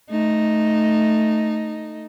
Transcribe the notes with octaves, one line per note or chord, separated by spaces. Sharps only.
A3 D#4